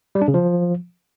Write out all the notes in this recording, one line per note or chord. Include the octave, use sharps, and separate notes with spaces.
G3
D4
C#3
F3